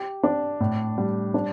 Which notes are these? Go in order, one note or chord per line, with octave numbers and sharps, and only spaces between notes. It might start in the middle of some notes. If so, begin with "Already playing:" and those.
Already playing: G4
D4
A2
G3
D4